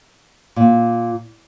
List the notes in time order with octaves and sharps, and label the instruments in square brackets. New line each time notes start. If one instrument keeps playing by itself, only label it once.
[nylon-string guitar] A#2